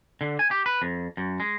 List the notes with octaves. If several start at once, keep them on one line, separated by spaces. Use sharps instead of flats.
D3
G#5
G4
B4
F2
F#2
G#3